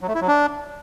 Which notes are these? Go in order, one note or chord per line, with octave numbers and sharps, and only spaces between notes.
F#3
A3
E4
F#3
D4